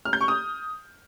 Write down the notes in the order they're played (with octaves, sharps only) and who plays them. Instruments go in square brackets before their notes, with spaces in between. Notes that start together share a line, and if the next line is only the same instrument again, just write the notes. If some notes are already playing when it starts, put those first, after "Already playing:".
[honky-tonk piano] F6
G6
C#6
D#6